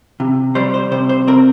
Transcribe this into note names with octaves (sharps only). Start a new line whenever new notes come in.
C3
G3 C5
C5
C3 C5
C5
C4 A#4